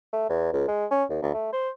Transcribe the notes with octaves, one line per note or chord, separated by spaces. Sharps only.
A3
E2
C#2
G#3
C#4
D#2
D2
A3
C5